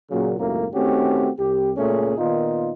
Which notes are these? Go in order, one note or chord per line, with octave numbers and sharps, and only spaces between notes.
A#2 C#3 F#3
G#1 C#2 F#2 A2 A#3 A#4
D#3 A3 C4 C#4 F#4 G4
C2 G4
C#2 A#2 A3 C#4 G#4
A#2 D#3 B3 D#4 F4